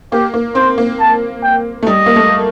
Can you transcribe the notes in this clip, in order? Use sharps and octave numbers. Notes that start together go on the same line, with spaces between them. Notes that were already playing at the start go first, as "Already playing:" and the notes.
A#3 G4
A#3
C4 C5
A#3
A5
G5
A3
G3 D#5
A#3
A3